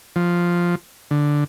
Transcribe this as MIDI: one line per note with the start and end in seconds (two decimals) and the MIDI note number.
0.16 0.75 53
1.11 1.44 50